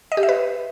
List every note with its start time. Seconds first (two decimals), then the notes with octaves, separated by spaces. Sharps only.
0.12 D#5
0.17 G4
0.23 E5
0.29 B4